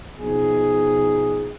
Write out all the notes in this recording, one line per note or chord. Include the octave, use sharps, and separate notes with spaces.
B2 F3 D#4 G#4